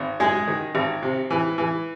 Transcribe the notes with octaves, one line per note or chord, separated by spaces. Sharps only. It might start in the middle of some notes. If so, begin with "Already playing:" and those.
Already playing: G#1
F#2 G#3 G#4
D#3
G#1
C3
E3
E3